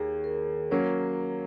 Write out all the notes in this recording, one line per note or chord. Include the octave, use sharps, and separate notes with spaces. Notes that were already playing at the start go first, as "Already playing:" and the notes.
Already playing: D#2 G#4 C#5
A#4
F#3 A#3 C#4 C#5